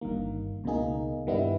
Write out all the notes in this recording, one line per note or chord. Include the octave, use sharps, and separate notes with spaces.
G1 G2 D#3 A#3
C#2 B2 A#3 D#4 G#4
G2 D#3 G3 B3 E4